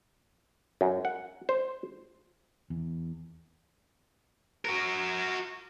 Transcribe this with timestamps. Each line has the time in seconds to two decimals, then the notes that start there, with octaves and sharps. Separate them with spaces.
0.81 F#2
1.05 F#5
1.49 C5
2.70 E2
4.65 F#4 A#4